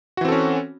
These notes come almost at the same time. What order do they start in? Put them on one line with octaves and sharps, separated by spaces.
F#4 E3 C4 A4 C#4